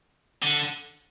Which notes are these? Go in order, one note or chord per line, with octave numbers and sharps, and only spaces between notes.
D3